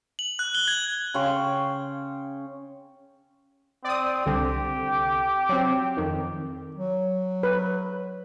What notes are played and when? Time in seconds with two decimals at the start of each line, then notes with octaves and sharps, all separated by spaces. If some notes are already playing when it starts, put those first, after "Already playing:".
0.19 F#7
0.39 F#6
0.55 G7
0.68 G#6
1.14 C#3 C#5 G5 C6
3.85 C4 D5 D#6
4.26 C2 D3 C4 G4
5.49 F#3 C4
5.97 F2 D#3
6.75 F#3
7.43 B4